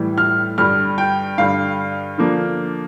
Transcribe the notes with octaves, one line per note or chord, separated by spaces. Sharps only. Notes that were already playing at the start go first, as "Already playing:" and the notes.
Already playing: A2 E3 G3
F6
G2 D3 G3 F6
G5
G2 D3 G3 F5
D3 F3 A#3 D4